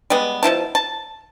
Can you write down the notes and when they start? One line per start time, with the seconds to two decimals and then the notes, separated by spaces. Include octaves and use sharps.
0.10 G3 G#3 B3
0.43 B2 F3 E4 A5
0.75 A5